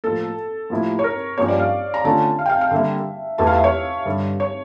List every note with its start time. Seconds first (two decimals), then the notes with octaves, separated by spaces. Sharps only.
0.04 A2 F3 A#3 A4
0.70 A2 F3 A#3 E4 G4
0.99 C#5
1.04 A#4
1.37 G2 F3 A#3 C#4 G4 C#5
1.48 D5
1.60 F5
1.94 A#5
2.05 D3 A3 C#4 F4 A5
2.39 F5
2.46 G5
2.50 F5
2.61 F5
2.71 D3 G3 A#3 E5
3.38 E2 E3 A3 E4 G4 A5
3.47 F5
3.55 E5
3.64 C#5
4.05 G2 D3 G3
4.40 C#5